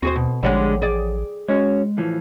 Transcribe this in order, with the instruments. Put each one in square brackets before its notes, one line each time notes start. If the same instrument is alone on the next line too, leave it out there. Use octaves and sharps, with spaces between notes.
[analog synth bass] D#2 [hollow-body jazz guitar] C4 [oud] F#4 G#4 C5
[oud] B2
[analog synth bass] A1 [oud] D3 G3 G#3 [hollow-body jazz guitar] F3 C#5 F#5
[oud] G#4 D5
[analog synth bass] G#3 [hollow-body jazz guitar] C#4 F#4 C#5
[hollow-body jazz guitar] A2 E3 F3